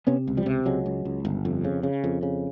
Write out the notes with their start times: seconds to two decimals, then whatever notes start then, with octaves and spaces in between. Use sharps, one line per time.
0.07 C3 B3 C#4
0.27 C#2
0.37 F3 G3
0.46 C3
0.65 C#2 F#3 G#3
0.86 C#2
1.05 C#2
1.25 G1
1.45 F2
1.64 C#3
1.83 C#3
2.04 F2
2.23 C#3